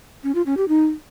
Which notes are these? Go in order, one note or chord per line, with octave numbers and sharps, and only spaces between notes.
C#4
F4
C#4
G4
D#4